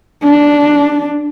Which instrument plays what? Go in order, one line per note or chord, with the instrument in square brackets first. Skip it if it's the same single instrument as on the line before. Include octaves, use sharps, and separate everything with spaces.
[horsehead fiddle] D4